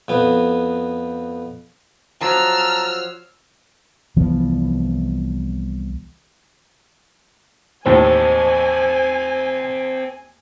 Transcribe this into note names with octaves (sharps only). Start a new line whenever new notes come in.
F2 B3
F3 F#3 A5 A#5 E6 F6
C2 E3 F3 B3
D#2 A2 C4 A4 C5 G#5